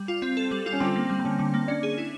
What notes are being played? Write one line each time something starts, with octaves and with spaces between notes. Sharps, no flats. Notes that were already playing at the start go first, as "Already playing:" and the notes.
Already playing: G3
F4
C4
A4
G3
F4
C#4
D3 C4
A#3
G3
C4
D3 C#4
D3
A#3
C#4 D4
G#4
E4